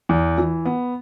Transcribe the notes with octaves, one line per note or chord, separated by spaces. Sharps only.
E2
E3
B3